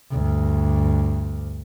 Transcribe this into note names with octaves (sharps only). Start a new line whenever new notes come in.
D2 G2